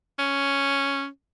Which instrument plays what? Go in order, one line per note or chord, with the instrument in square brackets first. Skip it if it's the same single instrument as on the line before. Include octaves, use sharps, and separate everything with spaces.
[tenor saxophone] C#4